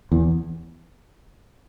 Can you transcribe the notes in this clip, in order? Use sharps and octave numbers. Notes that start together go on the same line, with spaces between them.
E2